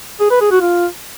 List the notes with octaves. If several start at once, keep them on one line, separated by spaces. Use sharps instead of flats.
G#4
B4
G#4
F#4
F4